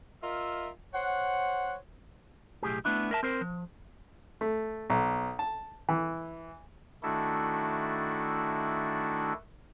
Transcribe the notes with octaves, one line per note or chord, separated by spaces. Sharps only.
F4 A#4 D#5 E5
C5 C#5 F#5
B1 A2 G4 G#4
A3 B3 D4 E4
A#4 E5 A5
C4 A#4 C5
F3
A3
B1
A5
E3
D#3 A3 D4 E4 F#4 A4